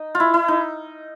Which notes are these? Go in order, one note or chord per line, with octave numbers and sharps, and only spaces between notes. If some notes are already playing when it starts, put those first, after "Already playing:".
Already playing: D#4
F4
E4
E4
D#4